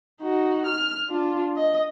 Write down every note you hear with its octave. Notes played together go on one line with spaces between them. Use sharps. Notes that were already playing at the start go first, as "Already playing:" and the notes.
D#4 F#4
F6
D4 F4
D#5